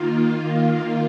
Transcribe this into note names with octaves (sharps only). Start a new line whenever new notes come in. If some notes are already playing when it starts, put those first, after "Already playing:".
Already playing: D#3 A#3 F4